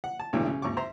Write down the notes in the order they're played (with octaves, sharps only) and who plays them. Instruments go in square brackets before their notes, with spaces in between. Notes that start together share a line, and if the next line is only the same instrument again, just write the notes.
[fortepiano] F#5
A5
B1 A2 D3 E3 G#3 B3
C#3
G#1 D#2 C#6 D6
C5 E5 A#5 C6